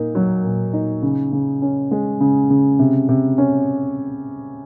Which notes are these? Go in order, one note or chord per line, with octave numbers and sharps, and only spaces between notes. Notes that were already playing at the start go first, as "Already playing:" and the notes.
Already playing: A#2 A#3 D#4
F#3
A#2
D#4
C#3
C#3
C#4
G#3
C#3
C#3
C3
C3
C#4